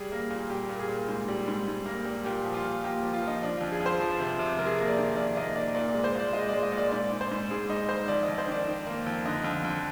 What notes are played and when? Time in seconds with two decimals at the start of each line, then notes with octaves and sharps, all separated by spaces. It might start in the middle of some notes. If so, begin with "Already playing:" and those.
Already playing: G3 G#4
0.12 A#3
0.30 A#2
0.50 G3 G4
0.69 A#2
0.80 G#4
0.89 A#2
1.08 G#2
1.28 G3
1.47 G#2
1.67 G#2
1.86 A#3
2.05 G3
2.25 A#2 G4
2.45 F3
2.54 F4
2.64 A#2
2.84 A#3 G4
3.03 F3
3.13 F4
3.22 F3
3.27 D#4
3.42 F3 D4
3.57 F2 F4
3.72 G#4
3.80 F2
3.86 C5
4.00 F3
4.20 C3
4.39 C3
4.59 F2 A#4
4.66 G#4
4.75 A#3 A#4
4.88 D5
4.98 D#3
5.16 F2 D5
5.37 A#3 D#5
5.56 A#3 D5
5.75 A#2 D5
5.90 G#3 D5
6.04 C5
6.15 A#2 D5
6.33 G#3 D#5
6.49 G#3 D5
6.63 D#5
6.72 A#2
6.78 D5
6.91 G#2 D5
7.12 G#2
7.21 C5
7.31 G#2
7.51 G#2 G#4
7.69 G#2 D#4
7.89 G#2 C5
8.08 F2 D5
8.23 D#5
8.28 F2
8.38 C5
8.48 D#3 D5
8.67 D#3
8.86 A#3
9.06 F2
9.25 D3 D#5
9.44 F2
9.64 F2